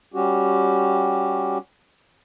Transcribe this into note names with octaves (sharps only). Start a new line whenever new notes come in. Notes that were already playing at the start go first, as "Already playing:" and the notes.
G3 C#4 F#4 G4